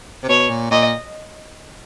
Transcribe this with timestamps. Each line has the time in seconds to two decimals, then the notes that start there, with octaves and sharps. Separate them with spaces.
0.23 C3
0.29 B2 C#5
0.50 A#2
0.71 A#2 D#5